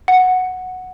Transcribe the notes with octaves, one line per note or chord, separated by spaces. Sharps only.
F#5